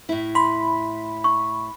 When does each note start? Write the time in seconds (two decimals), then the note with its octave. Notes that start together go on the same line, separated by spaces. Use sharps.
0.09 A2 E4
0.35 B5 C6
1.24 C#6